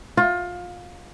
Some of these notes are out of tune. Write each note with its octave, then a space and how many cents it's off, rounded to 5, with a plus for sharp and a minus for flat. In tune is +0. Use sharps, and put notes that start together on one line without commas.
F4 +25